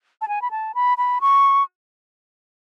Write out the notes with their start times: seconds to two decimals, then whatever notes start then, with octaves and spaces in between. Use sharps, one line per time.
0.21 A5
0.28 G#5
0.42 B5
0.51 A5
0.75 B5
0.98 B5
1.21 C#6